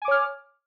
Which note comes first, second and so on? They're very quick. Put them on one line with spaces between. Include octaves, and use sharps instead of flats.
G#5 D6 C#5 F6